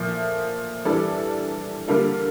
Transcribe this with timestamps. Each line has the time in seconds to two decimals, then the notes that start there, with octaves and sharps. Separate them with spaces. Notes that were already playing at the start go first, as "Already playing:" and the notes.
Already playing: A#2 F3 A3
0.85 E3 G3 D4 A4 D5
1.88 D3 G3 A#3 F4 A4